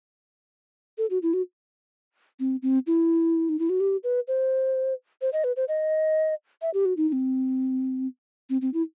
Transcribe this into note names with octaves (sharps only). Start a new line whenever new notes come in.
A4
F#4
E4
F#4
C4
C4
E4
D#4
E4
F#4
G4
B4
C5
C5
D#5
B4
C5
D#5
E5
G4
F#4
D#4
D#4
C4
C4
C4
E4